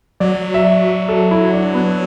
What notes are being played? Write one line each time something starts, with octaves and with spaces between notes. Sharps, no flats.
F#3 D5
E5
D5
A4
E4
D4
B3